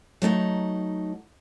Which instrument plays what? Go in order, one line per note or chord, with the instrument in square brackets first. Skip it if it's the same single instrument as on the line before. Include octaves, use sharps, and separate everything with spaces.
[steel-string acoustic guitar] F#3 A3 D#4 F#5